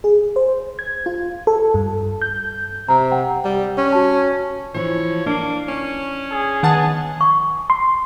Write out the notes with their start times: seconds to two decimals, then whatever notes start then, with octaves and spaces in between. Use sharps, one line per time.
0.04 G#4
0.36 C5
0.79 G#6
1.06 F4
1.47 A4
1.74 G2
2.22 G6
2.89 C3 A#5
3.12 F#5 G5
3.45 G3
3.78 C#4
3.92 F#4 A5
4.74 E3 F3 C#5
5.26 A#3 D4
5.68 C#4
6.32 G#4
6.63 D#3 B3 F#5 A5
7.21 C#6
7.70 C6